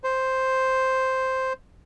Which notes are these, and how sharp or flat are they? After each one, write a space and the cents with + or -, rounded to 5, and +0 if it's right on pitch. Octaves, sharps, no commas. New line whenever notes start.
C5 +0